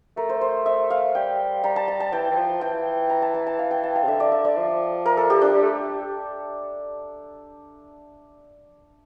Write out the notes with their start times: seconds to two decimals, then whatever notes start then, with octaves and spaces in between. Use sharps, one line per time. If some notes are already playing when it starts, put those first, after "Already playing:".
0.17 A3 A#4
0.29 C5
0.41 C5
0.66 E5
0.90 F5
1.15 G3 G5
1.63 G3 A#5
1.76 A5
1.88 A#5
2.00 A5
2.12 E3 G5
2.31 E3
2.37 F3
2.61 E3 G5
3.10 A#5
3.22 A5
3.34 A5
3.47 A5
3.59 F5
3.71 G5
3.83 A5
3.95 F5
4.03 C3
4.07 D3 E5
4.20 D5
4.32 E5
4.45 D5
4.57 F3
5.06 A#4
5.17 A4
5.30 G4
5.42 D4
5.54 G3
5.62 A3